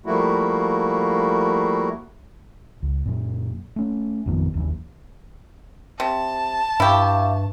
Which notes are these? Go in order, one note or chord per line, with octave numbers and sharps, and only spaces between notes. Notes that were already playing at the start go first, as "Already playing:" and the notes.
F3 G3 A3 A#3 E4 F#4
C#2
F#2 A#2
A3 C#4
A1 F2 D#3 B3
F#1 D#2 E3
C3 A5
G2 E4 G4 E5 F5 C#6